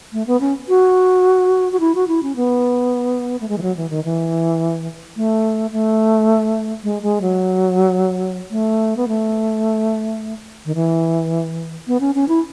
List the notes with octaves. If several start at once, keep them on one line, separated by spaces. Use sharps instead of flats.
A3
B3
C#4
F#4
F#4
E4
F#4
E4
C#4
B3
A3
G#3
E3
F#3
E3
D#3
E3
A3
A3
G#3
G#3
F#3
A3
B3
A3
D#3
E3
B3
C#4
C#4
E4